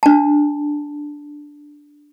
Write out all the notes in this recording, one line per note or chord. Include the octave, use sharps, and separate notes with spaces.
D4 A5